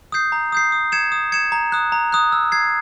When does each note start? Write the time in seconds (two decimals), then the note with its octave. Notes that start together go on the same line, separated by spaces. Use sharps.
0.12 D#6 G6 C7
0.32 A#5
0.52 D#6 G6 C7
0.72 D#6
0.92 G#6 C#7 E7
1.12 D#6
1.32 G#6 C#7 E7
1.52 A#5
1.72 D#6 F#6
1.92 A#5
2.12 D#6 F#6
2.32 E6
2.52 G#6 C7